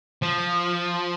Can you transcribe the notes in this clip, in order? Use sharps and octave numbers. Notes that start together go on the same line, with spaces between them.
F3